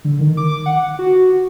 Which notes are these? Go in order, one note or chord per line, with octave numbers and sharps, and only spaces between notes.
D3
D#3
D6
F#5
F#4